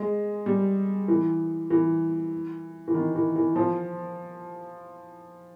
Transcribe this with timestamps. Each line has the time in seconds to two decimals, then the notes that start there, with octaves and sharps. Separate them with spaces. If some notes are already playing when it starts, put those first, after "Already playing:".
Already playing: G#3
0.46 G3
1.08 E3
1.70 E3
2.88 E3
2.94 D#3
3.15 E3
3.36 E3
3.56 F3